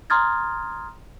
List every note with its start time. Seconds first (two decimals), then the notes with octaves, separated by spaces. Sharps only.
0.10 A#5 C6 D#6 F6 G#6 A6